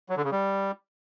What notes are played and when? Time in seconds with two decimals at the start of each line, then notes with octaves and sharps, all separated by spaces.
0.09 F#3
0.17 D3
0.24 C#3
0.32 G3